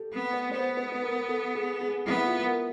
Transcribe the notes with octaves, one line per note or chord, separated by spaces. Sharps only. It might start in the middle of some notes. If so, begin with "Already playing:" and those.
Already playing: G4 A4
B3
B4
B3 C5
B4
B4
A#4
A4
G#4
G#4
B3 E4
E4
F4
A#4